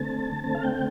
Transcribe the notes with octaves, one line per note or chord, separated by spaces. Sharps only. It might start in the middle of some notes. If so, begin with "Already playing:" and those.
Already playing: D3 A3 C4 A5
D3 A3 C4 A5
F5
G5